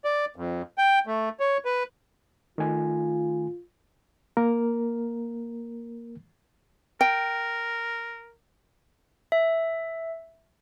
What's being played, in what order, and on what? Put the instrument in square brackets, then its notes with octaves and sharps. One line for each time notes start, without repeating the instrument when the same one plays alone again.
[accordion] D5
F2
G5
A3
C#5
B4
[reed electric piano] D#3 A3 G#5 [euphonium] F4
[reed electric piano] A#3 A#4
[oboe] A#4 [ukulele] G5
[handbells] E5